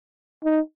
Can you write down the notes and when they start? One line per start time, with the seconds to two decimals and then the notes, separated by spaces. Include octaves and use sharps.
0.44 D#4